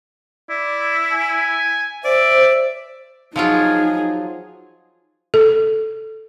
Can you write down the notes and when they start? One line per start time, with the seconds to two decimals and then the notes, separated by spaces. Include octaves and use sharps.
0.50 E4 D5
1.13 G#5
2.04 C5 D5 E5
3.36 F3 F#3 D#4 F4 G#4
5.34 A4